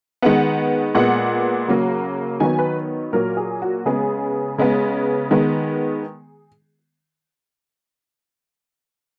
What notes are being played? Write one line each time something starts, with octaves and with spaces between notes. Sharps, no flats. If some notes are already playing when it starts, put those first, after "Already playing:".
D#3 G#3 B3 F#5
A#2 G#3 B3 F#5
C#3 F#3 A#3
D#3 F#3 B3 G#5
B4
A#2 F#3 A#3 A#4
G#4
F#4
C#3 G#3 B3 G#4
C#3 G#3 B3
D#3 G#3 B3